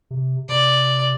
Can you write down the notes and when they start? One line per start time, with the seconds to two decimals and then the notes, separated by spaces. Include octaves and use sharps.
0.11 C3
0.49 C3 D5